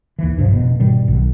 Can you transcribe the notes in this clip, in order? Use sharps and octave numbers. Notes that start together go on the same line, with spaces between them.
D#2 E3
C#2 G2 C3 F3
F1 B2
G#2 B2 D#3 G3
B1